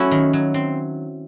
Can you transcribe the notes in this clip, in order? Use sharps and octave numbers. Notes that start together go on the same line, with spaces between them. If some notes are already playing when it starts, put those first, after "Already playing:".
Already playing: F#3 A3 C#4 E4 F#4
D#3
F#3
C4